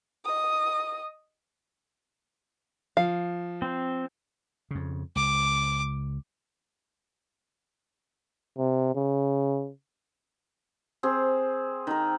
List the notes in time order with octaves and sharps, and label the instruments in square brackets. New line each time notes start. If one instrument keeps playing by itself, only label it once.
[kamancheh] D#5 D#6
[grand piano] F3 [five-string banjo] F5
[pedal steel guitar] C4 C5
[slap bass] F2 C#3
[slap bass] C#2 [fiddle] D6
[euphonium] C3
C#3
[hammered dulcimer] C4 G#4
D#3 A#4